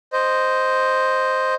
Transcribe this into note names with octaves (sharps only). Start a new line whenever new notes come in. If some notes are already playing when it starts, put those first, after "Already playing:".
C5 D#5